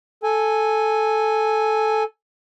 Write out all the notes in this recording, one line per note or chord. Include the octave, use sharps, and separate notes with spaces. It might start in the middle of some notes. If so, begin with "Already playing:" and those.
A4 G#5